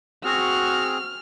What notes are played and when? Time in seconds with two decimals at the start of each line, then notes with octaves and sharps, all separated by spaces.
0.24 C4 F#4 G#4 F6